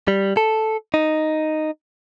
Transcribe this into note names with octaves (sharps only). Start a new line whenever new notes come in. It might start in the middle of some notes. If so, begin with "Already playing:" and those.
G3
A4
D#4